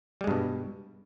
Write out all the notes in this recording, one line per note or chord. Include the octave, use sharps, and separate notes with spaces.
G2 B2 G3 G#3